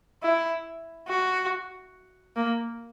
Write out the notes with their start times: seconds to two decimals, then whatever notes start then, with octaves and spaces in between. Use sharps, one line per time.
0.23 E4
1.08 F#4
2.36 A#3